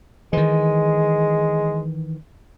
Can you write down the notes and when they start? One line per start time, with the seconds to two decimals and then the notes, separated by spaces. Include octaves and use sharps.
0.33 D#3 E3 G#3